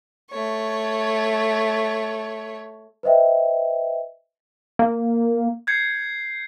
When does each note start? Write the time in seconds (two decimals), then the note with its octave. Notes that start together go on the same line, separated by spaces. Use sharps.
0.31 A3 C#5
3.03 B4 C5 D#5 E5 G5
4.79 A#3
5.67 G6 G#6 C7 C#7